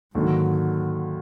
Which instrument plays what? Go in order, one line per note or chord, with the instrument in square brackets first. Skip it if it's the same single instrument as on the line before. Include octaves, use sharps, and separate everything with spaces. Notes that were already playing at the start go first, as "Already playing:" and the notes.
[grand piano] D#2 D3 F#3 [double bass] G#2